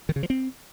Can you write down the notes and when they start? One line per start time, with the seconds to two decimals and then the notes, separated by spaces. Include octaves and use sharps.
0.09 D#3
0.16 C#3
0.23 F3
0.30 C4